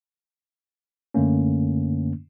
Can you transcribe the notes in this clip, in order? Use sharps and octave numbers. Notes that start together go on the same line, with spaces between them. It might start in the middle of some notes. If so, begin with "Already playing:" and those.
F#2 D3 A3 A#3 C#4